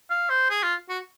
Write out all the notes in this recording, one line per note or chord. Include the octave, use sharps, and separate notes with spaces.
F5
C5
G#4
F4
F#4